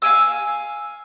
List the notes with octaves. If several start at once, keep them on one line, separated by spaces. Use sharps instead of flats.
F5 G5 G#5 E6